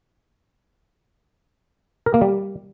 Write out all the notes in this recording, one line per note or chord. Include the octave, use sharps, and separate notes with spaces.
A#4
A#3
G3